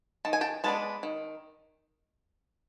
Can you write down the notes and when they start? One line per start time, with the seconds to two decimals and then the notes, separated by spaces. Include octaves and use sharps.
0.25 D#3 A5
0.33 G#5
0.41 G5 A5
0.64 G#3 B3 D4 A5
1.03 D#3